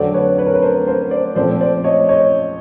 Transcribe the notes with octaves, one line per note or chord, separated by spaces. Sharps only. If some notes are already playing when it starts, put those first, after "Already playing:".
Already playing: F2 D3 F#3 A3 C4 C5 D5
B4 C#5
B4 C#5
A#4
B4
A#4 C5
A#4 C5
C5 D5
A#2 F3 A3 C4 C5 D5
C5 D5
C#5 D#5
C#5 D#5